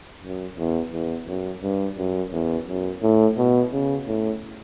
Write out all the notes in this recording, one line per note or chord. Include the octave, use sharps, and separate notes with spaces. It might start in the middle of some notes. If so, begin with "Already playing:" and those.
F#2
E2
E2
F#2
G2
F#2
E2
F#2
A2
B2
C#3
A2